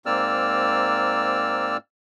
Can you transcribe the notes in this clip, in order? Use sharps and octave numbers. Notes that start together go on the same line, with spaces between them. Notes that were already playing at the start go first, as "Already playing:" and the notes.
G#2 A#3 C4 D5 E6 F6